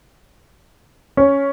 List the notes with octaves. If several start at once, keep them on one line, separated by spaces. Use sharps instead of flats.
C#4